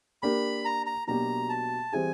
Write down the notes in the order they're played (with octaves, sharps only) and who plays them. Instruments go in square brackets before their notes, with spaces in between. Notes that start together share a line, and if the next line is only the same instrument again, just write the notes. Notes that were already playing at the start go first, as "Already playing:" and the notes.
[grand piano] A#3 D4 G4 A#4 [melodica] B5
[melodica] A#5
A#5
[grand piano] B2 F#3 A#3 D4 G4 [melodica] A#5
[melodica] A5
[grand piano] E3 G3 C4 E4 G#4 [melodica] G#5